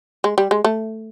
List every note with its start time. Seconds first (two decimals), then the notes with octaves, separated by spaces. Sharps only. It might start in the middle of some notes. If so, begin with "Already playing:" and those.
0.24 G#3
0.38 G3
0.51 G#3
0.64 A3